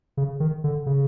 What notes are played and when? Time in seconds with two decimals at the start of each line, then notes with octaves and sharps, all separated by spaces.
0.17 C#3
0.40 D#3
0.64 D3
0.86 C#3